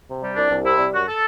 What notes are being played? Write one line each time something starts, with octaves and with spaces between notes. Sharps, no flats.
C3
G3
C2 D4
C2
C3 E4
G3
F#2 F#4
A4